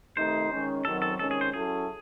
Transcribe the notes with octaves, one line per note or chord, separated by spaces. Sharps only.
C3 D#3 A3 D#4 C5
D#3 G#3 C#4
F#2 D#3 F#3 C4 A4
A4
C3 D#3 G#3 C#4 A4
G#4
C5
F#3 C#4 E4 G#4 A4